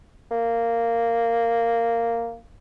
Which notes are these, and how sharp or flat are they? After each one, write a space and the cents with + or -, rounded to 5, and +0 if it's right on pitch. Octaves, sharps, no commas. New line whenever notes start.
A#3 -10